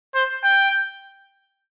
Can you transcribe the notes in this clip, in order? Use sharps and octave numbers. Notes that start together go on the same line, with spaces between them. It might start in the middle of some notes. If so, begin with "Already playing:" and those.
C5
G5